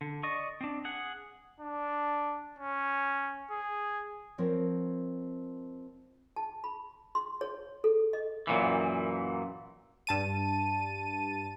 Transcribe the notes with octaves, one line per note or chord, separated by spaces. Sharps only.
D3
D5 D#5 C#6
C4 D4
G#4 F#5
D4
C#4
G#4
F3 C4 A#4 C#5 D#5
A5
B5
C6
C#5
A4
D#5
F#2 A#2 E3
G2 A5 D#7